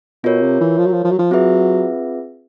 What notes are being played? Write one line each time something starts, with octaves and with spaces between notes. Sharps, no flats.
B2 F4 A#4 C#5
C3
E3
F3
F#3
F3
F3
F#3
F3
F#3 C4 F4 G#4 B4 E5